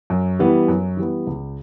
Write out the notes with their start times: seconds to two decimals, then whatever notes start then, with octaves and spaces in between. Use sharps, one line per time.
0.10 F#2
0.39 E3 G3 B3
0.68 F#2
0.97 E3 G3 B3
1.27 C#2